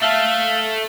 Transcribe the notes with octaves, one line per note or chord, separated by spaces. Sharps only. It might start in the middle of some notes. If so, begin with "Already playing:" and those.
A3 A4 E5 F5